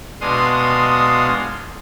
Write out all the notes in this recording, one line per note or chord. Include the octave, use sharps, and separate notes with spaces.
B2 G#3 D4 F5 C6 D#6